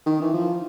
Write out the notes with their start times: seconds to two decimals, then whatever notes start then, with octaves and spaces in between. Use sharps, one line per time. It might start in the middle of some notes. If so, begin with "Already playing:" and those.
0.06 D#3
0.20 E3
0.34 F3